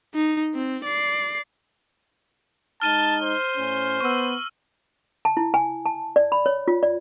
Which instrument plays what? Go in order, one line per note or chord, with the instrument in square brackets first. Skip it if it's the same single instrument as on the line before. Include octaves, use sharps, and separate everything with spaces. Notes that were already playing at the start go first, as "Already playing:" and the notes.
[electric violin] D#4
C4
D5 C7
[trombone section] G#3 D#4 [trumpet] A5 [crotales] F6 D#7 G7
[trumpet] C5
[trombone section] A2 C#4
[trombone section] B3 [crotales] C#6 E6
[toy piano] A5
E4
G#5
A5
D5
B5
C#5
F4
D5